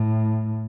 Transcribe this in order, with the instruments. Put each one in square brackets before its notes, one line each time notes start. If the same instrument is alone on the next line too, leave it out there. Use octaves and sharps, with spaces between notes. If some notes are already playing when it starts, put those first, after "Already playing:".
Already playing: [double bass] A2